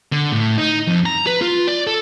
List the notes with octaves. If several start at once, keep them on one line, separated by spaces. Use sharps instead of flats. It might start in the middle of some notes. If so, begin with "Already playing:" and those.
D3
A2
D#4
F2
A#5
B4
F4
D5
A4